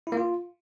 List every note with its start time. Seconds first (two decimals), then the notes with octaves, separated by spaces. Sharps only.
0.07 E4
0.12 A#3
0.17 F4